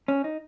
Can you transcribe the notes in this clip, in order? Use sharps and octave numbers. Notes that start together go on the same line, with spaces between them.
C#4
D#4